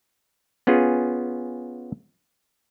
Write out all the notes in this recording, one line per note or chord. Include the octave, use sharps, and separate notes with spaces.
B3 C#4 F4 G#4